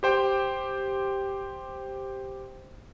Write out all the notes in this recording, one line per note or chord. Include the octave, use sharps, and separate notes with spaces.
G4 C5 G5